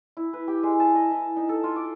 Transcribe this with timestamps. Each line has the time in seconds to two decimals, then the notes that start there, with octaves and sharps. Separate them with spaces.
0.17 E4
0.33 B4
0.48 G4
0.63 G#3
0.80 A5
0.95 D#5
1.11 E4
1.37 D#4
1.49 A4
1.64 F4
1.76 D6